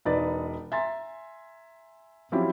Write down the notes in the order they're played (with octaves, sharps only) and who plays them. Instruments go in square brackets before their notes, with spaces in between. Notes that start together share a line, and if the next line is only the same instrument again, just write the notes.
[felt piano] E1 D#4 B4 D5 A6
E5 G#5 A#5 C6 A6
F3 F#3 C4 C#4 E4 G4